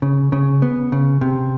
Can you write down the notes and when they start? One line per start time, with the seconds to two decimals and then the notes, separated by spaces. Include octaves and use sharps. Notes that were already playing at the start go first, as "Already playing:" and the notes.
0.02 C#3
0.32 C#3
0.62 B3
0.92 C#3
1.21 C3